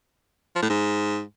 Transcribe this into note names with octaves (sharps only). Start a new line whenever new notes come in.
F3
A2
G#2